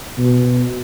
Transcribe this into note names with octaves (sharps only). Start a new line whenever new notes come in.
B2